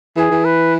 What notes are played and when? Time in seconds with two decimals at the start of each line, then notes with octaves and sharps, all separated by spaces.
0.17 E3 G#4
0.31 E3
0.45 B4